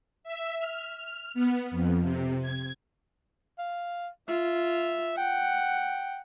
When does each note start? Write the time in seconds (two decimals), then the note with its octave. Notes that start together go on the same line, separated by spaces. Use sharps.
0.24 E5
0.59 F6
0.96 F6
1.34 B3
1.71 F2
2.02 C3
2.41 G#6
3.58 F5
4.28 F4 E5
5.17 F#5 G5